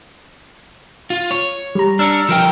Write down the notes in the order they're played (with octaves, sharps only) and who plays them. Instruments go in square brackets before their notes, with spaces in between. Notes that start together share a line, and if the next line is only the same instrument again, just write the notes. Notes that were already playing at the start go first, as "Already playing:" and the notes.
[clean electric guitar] F4
C#5
[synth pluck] G3 A#5
[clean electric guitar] D4 [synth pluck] E6 F6 C#7
[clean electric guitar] F3 A#4 G5